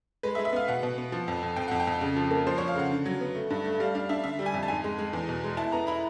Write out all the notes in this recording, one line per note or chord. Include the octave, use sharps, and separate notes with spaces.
G#3 B4
E5
G#3
E5
B3 F5
B2 F#5
B2
B3
F3
F2
F2
F2 G5
F2 F#5
G5
F2
C#3
F3
A#3
F3 C5
F3 C#5
F5
C#3 F#5
D3
F#3
B3
A3
G2
A3
G3 F5
D4 F5
D4 E5
D3 E5
G3
G#5
F2
A5
G#2 G#5
G#3
G#3
E2
B2
G#3
E4 A5
B3 A#5
E4 B5